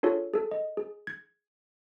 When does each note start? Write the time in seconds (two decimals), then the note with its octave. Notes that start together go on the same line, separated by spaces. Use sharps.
0.03 D4 F4 G#4 A4 C#5
0.34 G#4 A4
0.51 D#5
0.77 G#4
1.07 G#6